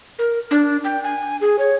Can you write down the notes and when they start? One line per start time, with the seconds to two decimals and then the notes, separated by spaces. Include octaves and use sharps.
0.19 A#4
0.51 D4
0.84 G5
1.03 G#5
1.41 G#4
1.59 C#5